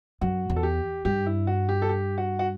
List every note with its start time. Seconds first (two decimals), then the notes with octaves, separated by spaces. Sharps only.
0.21 F#2 F#4
0.50 E2
0.56 A4
0.63 G4
1.05 G2 G4
1.26 E4
1.47 F#4
1.69 G4
1.82 A4
1.89 G4
2.18 F#4
2.39 F#4